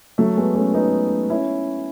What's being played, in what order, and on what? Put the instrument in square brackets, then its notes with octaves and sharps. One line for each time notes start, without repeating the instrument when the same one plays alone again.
[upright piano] F#3 A3
G#3 B3
A3 C#4
B3 D#4
C#4 E4